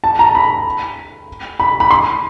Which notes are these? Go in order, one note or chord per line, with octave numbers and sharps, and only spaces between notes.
A5
A#5
B5
B5
B5
C6